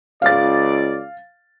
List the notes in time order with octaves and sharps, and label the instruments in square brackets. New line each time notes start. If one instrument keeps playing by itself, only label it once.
[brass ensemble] C#2 D5 [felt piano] F5 A6